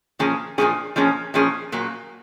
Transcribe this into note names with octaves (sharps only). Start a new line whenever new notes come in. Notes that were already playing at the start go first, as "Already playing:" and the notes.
A#2 F3 A#3 C#4 G#4
A#2 F3 A#3 C#4 G#4
A#2 F3 A#3 C#4 G#4
A#2 F3 A#3 C#4 G#4
A#2 F#3 A#3